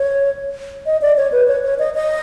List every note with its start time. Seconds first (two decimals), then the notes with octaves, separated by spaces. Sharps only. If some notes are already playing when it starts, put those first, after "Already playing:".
Already playing: C#5
0.86 D#5
1.02 D5
1.17 C#5
1.32 B4
1.48 C#5
1.63 C#5
1.79 D#5
1.94 D#5